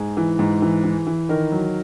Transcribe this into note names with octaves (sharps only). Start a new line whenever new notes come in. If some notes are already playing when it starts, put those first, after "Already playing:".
Already playing: G#2 G#4
E3
G#2
E3
E3
E3
D#3 A#4
F#3